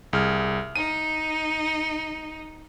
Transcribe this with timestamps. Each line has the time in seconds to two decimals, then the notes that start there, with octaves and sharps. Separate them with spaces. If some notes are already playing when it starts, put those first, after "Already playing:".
0.13 C2 G#4 F6
0.76 D#4 D#7